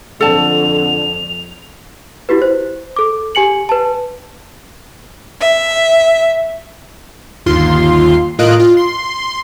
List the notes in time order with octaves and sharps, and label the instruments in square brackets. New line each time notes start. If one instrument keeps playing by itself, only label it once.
[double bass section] F2 [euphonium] D3 [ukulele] A4 A5 [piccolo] F7
[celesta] E4 F#4 G4 B4
C5
A4 D6
G4 G#5 C#7 F#7
B4 A5
[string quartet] E5
[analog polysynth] G1 D#2 F4 C6
A2 A#3 F4 D#5 F#6 D7
F4
C6